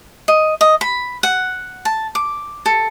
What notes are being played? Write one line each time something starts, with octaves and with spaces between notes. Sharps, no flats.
D#5
D#5
B5
F#5
A5
D6
A4